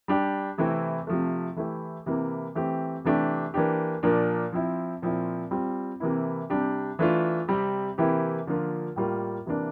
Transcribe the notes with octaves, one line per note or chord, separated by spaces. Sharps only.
G3 D4 G4
C3 E3 A3 C4 E4
C3 F3 A3
E3 A3 E4 G4
C3 E3 A#3 E4
E3 A3 C4 G4
C3 E3 A3 D4 G4
E3 A#3 D4 G4
A#2 F3 A#3 D4
F3 C4 E4
A#2 F3 C4 E4
G3 C4 F4
C3 E3 A#3 E4
C3 G3 D4 G4
E3 A3 D4 F4
C3 G3 C4 G4
C3 E3 A#3 E4 G4
D3 F3 A#3 F4
A2 G3 A#3 F4
C3 E3 A#3 D4